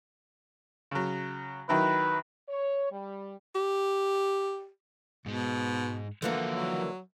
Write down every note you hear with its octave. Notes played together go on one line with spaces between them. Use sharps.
C#3 F#3
D#3 F#3 E4 B4
C#5
G3
G4
G#2 B2 G#3
D3 E3 F3 A#3 F#4
F#3